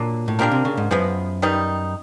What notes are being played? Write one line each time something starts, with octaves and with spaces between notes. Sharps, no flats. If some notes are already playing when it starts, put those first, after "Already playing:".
Already playing: A#2 F#3 A#3 D4
A2
A#2 A#3 D4 G4 A#4
C3
C#3
G#2
F#2 F3 G#3 B3
D#3 G3 B3 D#4